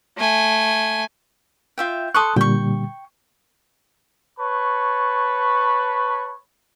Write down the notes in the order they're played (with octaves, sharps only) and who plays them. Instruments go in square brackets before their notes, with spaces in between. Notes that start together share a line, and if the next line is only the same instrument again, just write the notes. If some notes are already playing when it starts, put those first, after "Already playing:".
[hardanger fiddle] A3 G#5
[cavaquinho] F4 E5 G5
[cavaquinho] A4 C6 C#6 [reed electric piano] D#6 F#6
[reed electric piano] A#2 D3 G3 [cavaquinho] G5 C#6
[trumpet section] B4 C#5 A5 B5 C#6